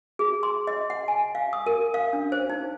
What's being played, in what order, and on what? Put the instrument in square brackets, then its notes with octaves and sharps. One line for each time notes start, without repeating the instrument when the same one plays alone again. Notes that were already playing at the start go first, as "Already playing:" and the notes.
[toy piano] G#4
C6
D#5
F#5
G#5
F5
D#6
A#4
F5
D4
C5
D#4